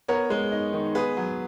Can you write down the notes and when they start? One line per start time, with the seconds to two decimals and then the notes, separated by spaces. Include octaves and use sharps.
0.08 B3 A#4 C#5
0.30 G#3
0.52 D#4
0.73 D#3
0.95 B3 G#4 B4
1.17 F#3